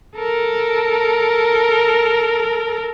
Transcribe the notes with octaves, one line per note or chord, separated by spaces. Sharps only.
A4 A#4